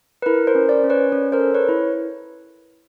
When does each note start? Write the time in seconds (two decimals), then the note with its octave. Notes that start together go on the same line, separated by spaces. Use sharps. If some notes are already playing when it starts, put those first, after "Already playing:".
0.22 B4
0.26 E4 A#4
0.47 A#4 C5
0.55 C#4
0.69 C5 D5
0.84 C#4
0.90 B4 C#5
1.12 C#4
1.32 A#4 C5
1.40 A4
1.54 B4 C#5
1.69 E4